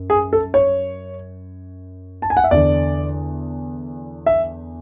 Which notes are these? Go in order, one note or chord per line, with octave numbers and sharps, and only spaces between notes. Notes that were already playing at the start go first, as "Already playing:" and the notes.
Already playing: F#2
G#4
A4
C#5
A5
G#5
F#5
E5
E2 D3 D5
E5